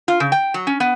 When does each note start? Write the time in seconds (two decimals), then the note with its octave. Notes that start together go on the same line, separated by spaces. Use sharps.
0.08 F4
0.20 C#3
0.32 G5
0.54 F#3
0.67 C#4
0.80 B3